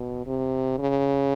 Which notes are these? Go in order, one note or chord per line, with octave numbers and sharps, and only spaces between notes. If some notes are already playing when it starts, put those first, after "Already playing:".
Already playing: B2
C3
C#3